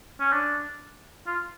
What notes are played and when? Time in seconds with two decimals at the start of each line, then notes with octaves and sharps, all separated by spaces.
0.20 C#4
0.32 D4
1.26 F4